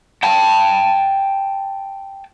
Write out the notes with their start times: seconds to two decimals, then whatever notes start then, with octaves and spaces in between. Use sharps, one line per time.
0.23 G5 A5